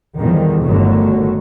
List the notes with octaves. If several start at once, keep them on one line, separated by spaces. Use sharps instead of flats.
E2 D3 D#3 F3 G3
G1 D3 D#3 F#3 A3